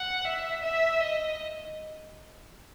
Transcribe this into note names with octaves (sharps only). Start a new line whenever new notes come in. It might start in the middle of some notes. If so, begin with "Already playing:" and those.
Already playing: F#5
E5
E5
D#5